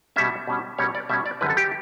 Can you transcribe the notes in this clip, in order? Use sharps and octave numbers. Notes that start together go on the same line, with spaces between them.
B2 G3 C#4 E5
B2 G3 C#4
B2 G3 C#4 C#5
D5
B2 G3 C#4 E5
D5
F#2 D3 G3 B4
A4
G4